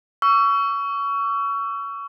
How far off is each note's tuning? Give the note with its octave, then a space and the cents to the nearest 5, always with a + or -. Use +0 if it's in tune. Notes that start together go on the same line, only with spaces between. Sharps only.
C#6 +25 E6 +30